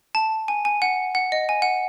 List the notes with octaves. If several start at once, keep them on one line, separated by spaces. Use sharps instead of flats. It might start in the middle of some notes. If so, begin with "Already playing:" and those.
A5
G#5
G#5
F#5
F#5
D#5
G#5
F#5